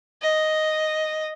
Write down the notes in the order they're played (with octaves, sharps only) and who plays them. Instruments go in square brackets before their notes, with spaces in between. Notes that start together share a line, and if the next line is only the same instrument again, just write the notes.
[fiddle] D#5